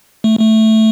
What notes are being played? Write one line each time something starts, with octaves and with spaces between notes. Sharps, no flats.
A3
A3